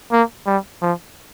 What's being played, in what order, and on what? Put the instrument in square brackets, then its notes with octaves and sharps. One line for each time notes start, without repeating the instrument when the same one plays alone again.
[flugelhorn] A#3
G3
F3